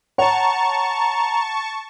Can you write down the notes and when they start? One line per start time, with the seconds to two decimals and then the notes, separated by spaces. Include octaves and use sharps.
0.18 C#5 F#5 A5 A#5 C#6